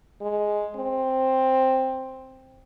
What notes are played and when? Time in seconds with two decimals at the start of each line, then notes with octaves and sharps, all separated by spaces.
0.22 G#3
0.76 C4